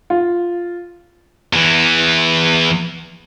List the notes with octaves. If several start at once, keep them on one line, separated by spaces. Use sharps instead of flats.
F4
E2 E3